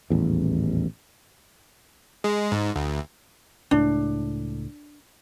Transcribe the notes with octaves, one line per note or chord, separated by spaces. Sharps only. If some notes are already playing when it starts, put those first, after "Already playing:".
D#1 A1 E2
G#3
G#2
D2
C#2 A2 D4